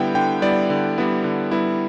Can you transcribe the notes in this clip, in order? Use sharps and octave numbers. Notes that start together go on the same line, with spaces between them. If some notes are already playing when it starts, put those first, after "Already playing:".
Already playing: D3 G3 B3 E4 F#5 G5
D3 G5
G3 B3 E4 D5
D3
G3 B3 E4
D3
G3 B3 E4